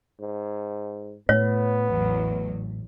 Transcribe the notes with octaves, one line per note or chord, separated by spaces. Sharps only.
G#2
A2 B3 C#5
A1 E2 F#3